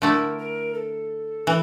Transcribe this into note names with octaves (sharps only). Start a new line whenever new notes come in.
D3 A3 E4 A#4
A#4
A4
E3